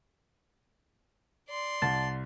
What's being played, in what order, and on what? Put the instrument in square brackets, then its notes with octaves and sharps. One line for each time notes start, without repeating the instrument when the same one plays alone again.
[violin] D5 C6
[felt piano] C2 [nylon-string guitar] A5 [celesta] A6